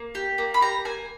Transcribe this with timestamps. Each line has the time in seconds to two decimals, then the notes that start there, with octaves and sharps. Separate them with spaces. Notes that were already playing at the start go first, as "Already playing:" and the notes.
Already playing: A#3
0.15 G4
0.38 A#3
0.54 B5
0.61 G4 A#5
0.85 A#3 G#5